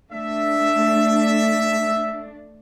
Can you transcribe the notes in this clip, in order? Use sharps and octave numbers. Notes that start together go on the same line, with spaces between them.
A3 D4 E5